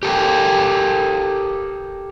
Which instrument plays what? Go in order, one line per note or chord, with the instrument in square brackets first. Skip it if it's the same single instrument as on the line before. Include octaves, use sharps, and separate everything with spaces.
[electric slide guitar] G4 A4 A#4 G5